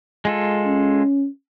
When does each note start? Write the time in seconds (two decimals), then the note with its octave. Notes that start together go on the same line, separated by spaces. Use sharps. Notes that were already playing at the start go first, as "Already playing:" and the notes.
0.25 G#3 F4 A4
0.66 C#4